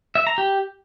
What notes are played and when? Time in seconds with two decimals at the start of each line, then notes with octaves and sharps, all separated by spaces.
0.15 E5
0.27 A#5
0.38 G4